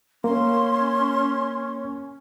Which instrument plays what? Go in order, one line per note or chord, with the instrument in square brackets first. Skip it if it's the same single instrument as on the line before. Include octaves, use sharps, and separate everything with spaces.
[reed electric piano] A#3 [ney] C#4 [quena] C6